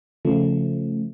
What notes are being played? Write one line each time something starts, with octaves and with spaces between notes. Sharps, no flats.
C#3 F3 A3